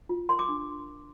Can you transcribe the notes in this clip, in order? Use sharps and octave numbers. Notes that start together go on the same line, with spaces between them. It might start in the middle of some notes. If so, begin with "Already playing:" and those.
F4
A#4 C6
D6
D4